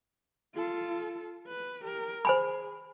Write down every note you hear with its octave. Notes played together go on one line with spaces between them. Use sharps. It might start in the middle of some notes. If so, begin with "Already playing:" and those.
F4 A4
B4
G4 A#4
G#4 C5 G#5 B5